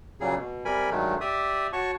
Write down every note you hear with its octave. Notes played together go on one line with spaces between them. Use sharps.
A#2 C#3 F#3 G3 G#4
B2
C3 G3 A#4 G#5 B5
G2 D#3 F#3 G#3 A3
G4 D5 E5 D#6
F#4 C#5 A5 C#6